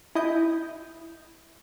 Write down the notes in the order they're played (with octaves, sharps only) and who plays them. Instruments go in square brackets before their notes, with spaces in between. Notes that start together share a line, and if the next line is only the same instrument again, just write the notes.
[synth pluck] E4 D#5 G6